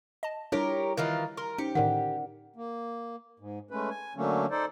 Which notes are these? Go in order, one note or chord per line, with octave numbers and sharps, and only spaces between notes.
D#5 A5
G3 D4 E4 F4 G4 A#4 C#5
D#3 E3 F4 A#4
A#4 C6
C#4 D#4 G4 C5 C#7
A2 D3 D#3 D#4 A#4 D5 F#5
A#3
G#2
G#3 A3 C#4 B4
G#5
D3 F#3 A3 A#3 C#4
D#4 A4 C5 D5